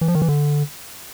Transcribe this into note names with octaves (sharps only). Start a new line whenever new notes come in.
E3
F3
D#3
E3
D3